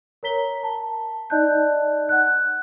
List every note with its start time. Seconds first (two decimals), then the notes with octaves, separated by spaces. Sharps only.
0.23 A#4 C#5 A#5 B6 G7
0.63 A5
1.30 D#4 D5 D#5 A5 F#6 G6
2.09 F#5 F#6